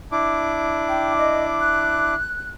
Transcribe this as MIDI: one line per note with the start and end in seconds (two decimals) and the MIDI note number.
0.12 2.14 62
0.12 2.14 64
0.12 2.14 86
0.88 1.12 79
1.17 1.43 75
1.60 2.51 90